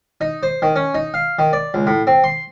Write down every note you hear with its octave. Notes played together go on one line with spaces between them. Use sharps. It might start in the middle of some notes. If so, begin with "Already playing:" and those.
D#4
C5
D#3
C#4
D#4
F5
D#3
D5
C#2
A2
C4
C6